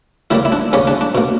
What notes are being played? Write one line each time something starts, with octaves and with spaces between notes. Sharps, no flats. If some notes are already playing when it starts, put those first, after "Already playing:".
C#3 G3 A#3 E4
E4
D4
C#3 G3 A#3 C#4
D4
D4
B2 A#3